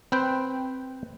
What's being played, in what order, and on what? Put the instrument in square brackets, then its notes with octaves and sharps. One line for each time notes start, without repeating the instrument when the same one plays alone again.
[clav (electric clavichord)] C4 B4 C5 G5